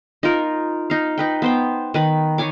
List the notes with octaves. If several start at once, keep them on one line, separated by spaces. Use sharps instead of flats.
D#4 F4 A#4
D#4 F5
D#4 B4 G5
B3 C5 G5
D#3 B4 B5
D#3 C#5 G#5 D6